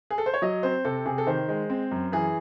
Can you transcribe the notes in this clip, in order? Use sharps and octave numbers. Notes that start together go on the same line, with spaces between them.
G#4
A4
C5
C#5
F#3 D#5
C4 C5
C3 A4
C3 G#4
A4
D#3 C5
G#3
C4
F#2
E3 G#4